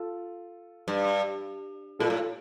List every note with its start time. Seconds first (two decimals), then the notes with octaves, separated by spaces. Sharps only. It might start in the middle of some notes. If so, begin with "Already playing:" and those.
Already playing: F4 A4
0.88 G2
1.99 A#2 F4 A4
2.10 A2